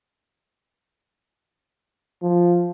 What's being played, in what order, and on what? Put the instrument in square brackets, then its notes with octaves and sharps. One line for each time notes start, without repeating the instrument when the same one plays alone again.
[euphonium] F3